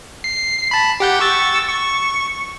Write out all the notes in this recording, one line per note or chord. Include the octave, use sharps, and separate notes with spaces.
C7
A5 B5
G4 F#5 G6
C#6 E6 A6
C#6